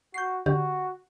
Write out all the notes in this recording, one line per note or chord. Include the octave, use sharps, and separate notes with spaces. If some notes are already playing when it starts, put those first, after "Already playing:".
F#4 G6 C7
D3 F#4 G4